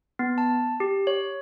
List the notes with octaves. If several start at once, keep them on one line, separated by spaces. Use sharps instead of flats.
B3
A5
G4
C#5